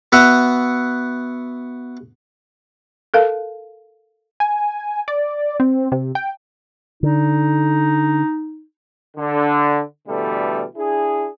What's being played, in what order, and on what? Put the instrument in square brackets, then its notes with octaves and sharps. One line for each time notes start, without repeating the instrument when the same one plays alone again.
[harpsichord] B3 F#4 E5 F#5
[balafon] A4 A#4 F5 A5
[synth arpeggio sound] G#5
D5
C4
C3
G5
[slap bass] D3 [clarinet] D#4
[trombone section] D3
B2 D3 E3 G3 A3
D4 E4 G#4